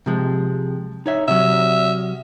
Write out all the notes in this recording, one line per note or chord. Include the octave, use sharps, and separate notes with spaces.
C3 F3 G#3
D#4 C#5 E5
C3 F#3 E5